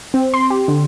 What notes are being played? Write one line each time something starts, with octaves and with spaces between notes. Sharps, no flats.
C4
C6
G4
D3